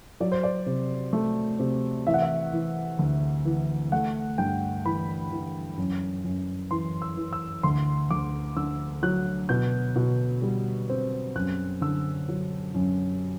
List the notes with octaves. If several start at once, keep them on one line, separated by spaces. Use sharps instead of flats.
F#3 D5
C5
D5
C3
A3
C3
E3 E5
F#5
E5
E3
D2
E3
A3 F#5
G2 G5
E3 B5
E3
F#2
F#2
E3 C6
E6
E3
E6
D2 C6
D2 D6
D3 E6
F#3 F#6
B2 G6
B2
G3
C4
F#2 F#6
D3 E6
F#3
F#2